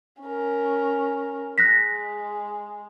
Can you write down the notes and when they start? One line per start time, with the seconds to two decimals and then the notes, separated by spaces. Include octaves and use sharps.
0.22 C#4 A#4
1.58 G#3 F#6 A#6 B6